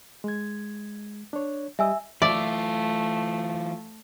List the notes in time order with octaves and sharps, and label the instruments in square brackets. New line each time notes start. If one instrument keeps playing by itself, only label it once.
[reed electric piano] G#3 G#6
D4 C#5
[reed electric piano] G3 G4 D#5 [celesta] E5 G#5 E6
[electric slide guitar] E3 F4 [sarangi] A3 [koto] D5 [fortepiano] E5 D6